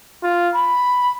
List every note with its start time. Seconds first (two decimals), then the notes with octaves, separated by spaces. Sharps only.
0.23 F4
0.55 B5